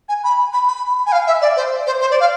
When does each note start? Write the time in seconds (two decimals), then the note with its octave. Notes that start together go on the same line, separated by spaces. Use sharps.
0.09 G#5
0.24 B5
0.53 B5
0.68 B5
1.06 G#5
1.12 F5
1.27 E5
1.41 D5
1.56 C5
1.87 C5
2.01 C5
2.11 D5
2.20 F5